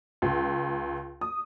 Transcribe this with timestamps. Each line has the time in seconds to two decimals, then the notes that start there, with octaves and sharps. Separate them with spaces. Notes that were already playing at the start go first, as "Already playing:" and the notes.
0.22 C#2
1.21 D#6